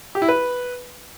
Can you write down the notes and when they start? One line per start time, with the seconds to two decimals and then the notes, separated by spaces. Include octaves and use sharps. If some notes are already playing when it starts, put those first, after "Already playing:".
0.15 G4
0.22 E4
0.29 B4